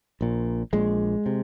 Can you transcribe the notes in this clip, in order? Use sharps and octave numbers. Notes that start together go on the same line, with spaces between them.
A#1 A#2
A#1 A#2 G#3
C3